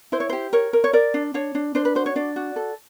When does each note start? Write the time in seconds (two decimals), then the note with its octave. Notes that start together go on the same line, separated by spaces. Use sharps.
0.12 E4 C5
0.20 C#5
0.29 G4 C5
0.53 A#4 C#5
0.73 A#4
0.84 C#5
0.93 A#4 D5
1.14 D4
1.34 D4 C#5
1.55 D4
1.75 D4 C5
1.85 B4
1.95 F#4 C5
2.06 C#5
2.16 D4 D5
2.36 F#4
2.56 A4